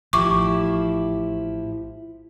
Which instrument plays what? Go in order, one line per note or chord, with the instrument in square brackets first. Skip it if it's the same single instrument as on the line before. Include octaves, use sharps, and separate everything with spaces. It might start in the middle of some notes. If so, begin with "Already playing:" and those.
[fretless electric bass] A1 [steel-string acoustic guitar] F3 E4 G4 [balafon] C#6 D6